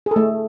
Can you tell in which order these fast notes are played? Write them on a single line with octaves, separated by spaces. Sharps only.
G#4 A4 A3